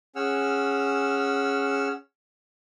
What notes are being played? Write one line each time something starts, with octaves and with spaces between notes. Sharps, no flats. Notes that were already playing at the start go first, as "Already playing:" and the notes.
C#4 G#4 F#5 E6 F6